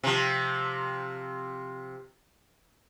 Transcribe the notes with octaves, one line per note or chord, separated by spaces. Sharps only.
C3 F3